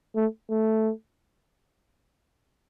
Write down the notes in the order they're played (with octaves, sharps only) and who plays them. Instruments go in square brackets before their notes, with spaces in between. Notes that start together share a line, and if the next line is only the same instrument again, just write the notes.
[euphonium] A3
A3